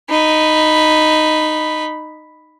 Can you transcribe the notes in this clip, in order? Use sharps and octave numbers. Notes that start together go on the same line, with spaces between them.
D#4 B5